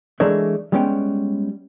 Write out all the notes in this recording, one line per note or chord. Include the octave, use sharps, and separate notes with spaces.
E3 G#3 A3 D4 A#4 C#5
G3 G#3 B3 C#4 C#5 G5